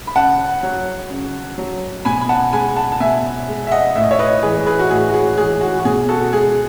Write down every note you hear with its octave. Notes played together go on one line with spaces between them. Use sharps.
B5
C#3 F#5 A5
F#3
C#3
F#3
B2 G#5 B5
B5
F#5 A5
G#3 G#5 B5
F#5 A5
A5
B2 E5 G#5
G#3
E5
D#5 F#5
A2 E5
D#5
C#5 E5
B4 D#5
E3 G#3 G#4 B4
G#4 B4
F#4
A2 G#4
F#4
G#4
E3 G#3 G#4
F#4
F#4
B2 G#4
F#4 A4
G#3 G#4